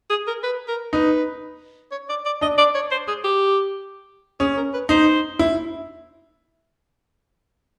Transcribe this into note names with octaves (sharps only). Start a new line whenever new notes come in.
G#4
A#4
B4
A#4
D#4 B4
C#5
D5
D5
D4 D#5
D5
C#5
C5
G#4
G4
C#4 G#4
A#4
B4
D#4 C5
E4